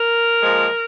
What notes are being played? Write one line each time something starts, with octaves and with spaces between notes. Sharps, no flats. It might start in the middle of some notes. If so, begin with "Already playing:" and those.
Already playing: A#4
A#2 F3 G#3